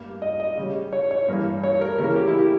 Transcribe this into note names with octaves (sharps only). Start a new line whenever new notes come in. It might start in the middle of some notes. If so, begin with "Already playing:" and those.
Already playing: G2 G3 A#3
D#5
D#5
C#3 G3 C#4
C#5
C#5
G2 E3 A#3
C#5
A#4
C#3 E3 A#3 C#4 A#4
G4
E4
G4